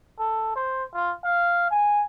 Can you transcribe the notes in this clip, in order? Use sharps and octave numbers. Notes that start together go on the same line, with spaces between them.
A4
C5
F4
F5
G#5